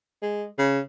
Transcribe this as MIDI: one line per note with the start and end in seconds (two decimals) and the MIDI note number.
0.23 0.45 56
0.59 0.80 49